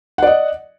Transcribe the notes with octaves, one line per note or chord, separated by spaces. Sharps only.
D5 D#5 F#5